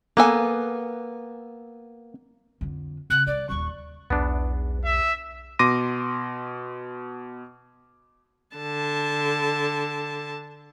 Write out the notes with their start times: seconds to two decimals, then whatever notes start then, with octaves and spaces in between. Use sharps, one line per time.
0.17 A#3 B3 A4 G#5
2.61 F2 D3
3.10 C#3 F#6
3.27 C2 D5
3.49 D#1 D#2 C#6
4.10 B1 E2 B3 D4
4.84 E5
5.59 B2 C6 D6 A#6 D#7
8.56 D3 A5